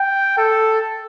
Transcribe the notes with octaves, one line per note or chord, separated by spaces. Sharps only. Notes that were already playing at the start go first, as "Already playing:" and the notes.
Already playing: G5
A4